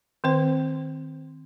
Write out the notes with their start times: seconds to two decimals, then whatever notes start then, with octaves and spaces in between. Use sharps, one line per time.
0.24 D#3 C4 C5